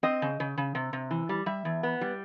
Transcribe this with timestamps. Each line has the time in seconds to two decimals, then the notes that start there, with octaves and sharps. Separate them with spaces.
0.03 C4 D#5
0.22 C#3
0.40 C#3
0.58 C#3
0.75 C3
0.93 C3
1.11 E3
1.29 G3
1.46 G3 E5
1.65 E2
1.83 B3
2.01 G3